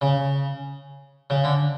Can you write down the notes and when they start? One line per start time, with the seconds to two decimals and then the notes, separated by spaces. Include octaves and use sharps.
0.01 C#3
1.30 C#3
1.44 D3